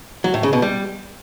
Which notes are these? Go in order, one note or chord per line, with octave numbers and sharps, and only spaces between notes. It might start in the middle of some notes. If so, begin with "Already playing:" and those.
F#3
A2
C#3
B2
G3